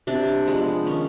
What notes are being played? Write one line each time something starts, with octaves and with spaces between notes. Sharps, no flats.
C3 D4
F3 G#3 B3
D#3 C#4